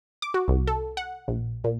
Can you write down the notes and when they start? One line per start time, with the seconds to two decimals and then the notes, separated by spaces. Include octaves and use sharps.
0.22 D6
0.34 F#4
0.48 C2
0.67 A4
0.97 F#5
1.28 A#1
1.64 A#2